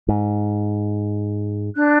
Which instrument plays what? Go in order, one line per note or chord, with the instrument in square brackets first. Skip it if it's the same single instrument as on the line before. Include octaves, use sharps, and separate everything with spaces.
[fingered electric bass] G#2
[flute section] D4 F#6